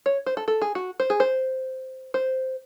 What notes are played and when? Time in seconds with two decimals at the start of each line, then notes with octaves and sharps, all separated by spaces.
0.06 C#5
0.26 C5
0.37 A4
0.48 A4
0.62 G#4
0.75 F#4
1.00 C5
1.10 G#4
1.20 C5
2.14 C5